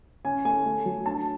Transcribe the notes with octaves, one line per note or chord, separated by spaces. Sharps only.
C#4 G#5
A3 G#5
A3
F#3
D4 A5